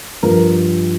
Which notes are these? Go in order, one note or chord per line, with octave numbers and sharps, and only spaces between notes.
G2 F3 A#4